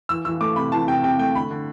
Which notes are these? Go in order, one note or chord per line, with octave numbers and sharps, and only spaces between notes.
E3 E6
E3 E6
A3 D6
C3 B5
E3 A5
C3 G5
C3 G5
A3 G5
D3 B5
D3